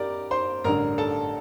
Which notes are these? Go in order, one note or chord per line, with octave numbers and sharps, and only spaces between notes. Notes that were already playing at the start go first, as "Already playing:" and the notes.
Already playing: D#4 G4 A#4 D5 D6
C5 C6
A1 G2 D3 A#4 A#5
A4 A5